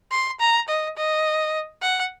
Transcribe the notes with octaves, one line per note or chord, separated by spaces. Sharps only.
C6
A#5
D#5
D#5
F#5